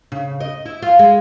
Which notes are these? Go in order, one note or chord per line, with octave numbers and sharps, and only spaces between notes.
C#3
D#5
E4
F4
G#3